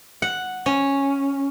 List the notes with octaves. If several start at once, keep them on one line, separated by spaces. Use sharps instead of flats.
F#5
C#4